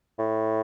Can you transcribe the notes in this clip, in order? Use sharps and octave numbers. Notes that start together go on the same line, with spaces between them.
A2